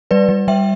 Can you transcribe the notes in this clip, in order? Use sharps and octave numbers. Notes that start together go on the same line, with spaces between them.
G3 B4 D5
G3
G3 E5 G5